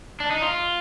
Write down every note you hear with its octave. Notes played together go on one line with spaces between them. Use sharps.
D4
D#4
F4